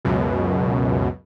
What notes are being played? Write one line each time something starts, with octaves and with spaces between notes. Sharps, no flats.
C#2 F#2 B2